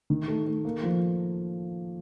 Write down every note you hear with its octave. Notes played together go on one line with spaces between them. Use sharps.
D#3
A3
A3
A#3
F3